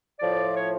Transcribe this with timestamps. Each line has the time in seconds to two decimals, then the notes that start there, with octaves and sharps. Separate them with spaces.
0.20 A2 F3 D5
0.55 C#5